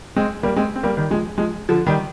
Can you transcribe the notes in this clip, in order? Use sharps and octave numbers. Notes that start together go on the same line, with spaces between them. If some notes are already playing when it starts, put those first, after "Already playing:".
G#3 C4
G3 A#3
G#3 C4
C4
G3 A#3
D#3 G3
F3 G#3
F3 G#3
D3 F3
D#3 G3